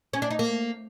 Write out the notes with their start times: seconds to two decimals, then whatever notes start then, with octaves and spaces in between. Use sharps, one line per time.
0.13 C#4
0.22 D4
0.31 D#4
0.39 A#3